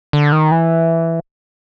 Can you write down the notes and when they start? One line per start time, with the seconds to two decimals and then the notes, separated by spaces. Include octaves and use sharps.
0.13 D3
0.32 D#3
0.51 E3